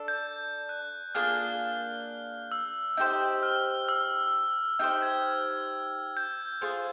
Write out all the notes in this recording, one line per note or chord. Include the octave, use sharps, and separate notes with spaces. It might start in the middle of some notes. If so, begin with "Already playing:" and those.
Already playing: D4 A4
G6
F#6
A#3 D4 F4 G#4 F6
E6
D#4 G4 C5
F6
E6
D#4 G4 C5 F6
G#6
G6
F4 G#4 C5